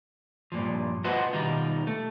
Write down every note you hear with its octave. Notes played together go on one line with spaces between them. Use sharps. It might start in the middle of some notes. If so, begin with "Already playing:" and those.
G2 A#2 F3
F4 F#4 B4 C5 D#5 F#5
B2 D#3 G3 D#4 F4
A3